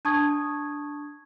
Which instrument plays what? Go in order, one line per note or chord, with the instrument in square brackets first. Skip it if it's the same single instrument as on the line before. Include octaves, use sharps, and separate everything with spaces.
[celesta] D4 A5 C#6 D#6 G#6